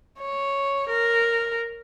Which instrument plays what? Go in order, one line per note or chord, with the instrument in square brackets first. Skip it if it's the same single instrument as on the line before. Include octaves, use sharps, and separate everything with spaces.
[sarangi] C#5
A#4